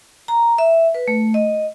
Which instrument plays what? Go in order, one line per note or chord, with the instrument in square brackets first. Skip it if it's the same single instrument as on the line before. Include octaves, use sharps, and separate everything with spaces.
[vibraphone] A#5
E5
B4
A3
D#5